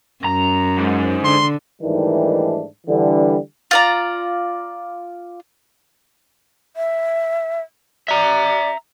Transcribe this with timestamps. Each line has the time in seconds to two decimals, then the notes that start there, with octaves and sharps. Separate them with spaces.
0.25 F#2 A#5
0.79 G#2
1.25 D3 C6
1.82 G#2 D#3 E3 G3 A3 D4
2.87 D3 E3 G3
3.71 F4 D5 A#5
6.76 E5
8.08 D5 E5 A#5